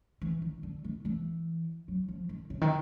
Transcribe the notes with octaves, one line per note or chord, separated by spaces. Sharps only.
E3
D#3
D3
D#3
E3
F#3
F3
D#3
C#3
D#3